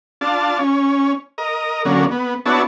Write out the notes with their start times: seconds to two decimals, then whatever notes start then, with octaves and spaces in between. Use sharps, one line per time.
0.21 D4 F4 A5
0.59 C#4
1.38 A#4 D#5
1.85 D3 F#3 A#3 C#4
2.11 B3
2.46 B3 D4 E4 F#4 C#5 A5